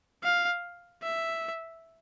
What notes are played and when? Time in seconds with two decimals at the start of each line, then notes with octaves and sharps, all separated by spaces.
0.23 F5
1.03 E5